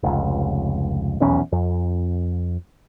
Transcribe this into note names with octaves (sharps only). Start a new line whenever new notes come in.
F1 C#2
D#1 B1 E2 C#4
F2